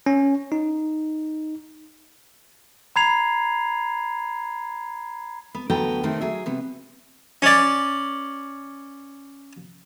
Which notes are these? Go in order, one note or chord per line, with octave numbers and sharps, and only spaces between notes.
C#4
D#4
A#5 B5 G#6 C7 F7
B3
D2 F#3 B3 A4 G5 A#5
C3 D#3 A3 C4
F#3 G#4 E5
C3 B3
C#4 D5